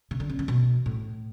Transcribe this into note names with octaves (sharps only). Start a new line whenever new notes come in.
C#3
D3
C#4
D3
B2
A2